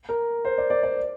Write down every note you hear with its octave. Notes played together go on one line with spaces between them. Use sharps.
A#4
C5
D5
D5
D5